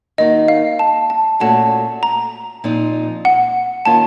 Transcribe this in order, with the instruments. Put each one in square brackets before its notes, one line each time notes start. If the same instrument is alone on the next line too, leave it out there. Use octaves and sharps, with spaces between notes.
[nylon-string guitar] D#3 A#3 D#4 F#4 [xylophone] D#5
[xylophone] F5
A5
A5
[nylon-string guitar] A#2 A3 C#4 F#4 [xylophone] A5
[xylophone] A#5
[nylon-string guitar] A#2 F3 C4 D#4
[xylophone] F#5
[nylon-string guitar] D#3 A#3 C#4 F4 [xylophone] A5